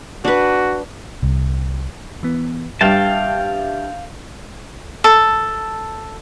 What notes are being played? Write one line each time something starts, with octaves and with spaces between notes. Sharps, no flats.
D4 F#4 B4
C2
E3 B3
G2 D4 G4 E5 F5 G5 A5
A4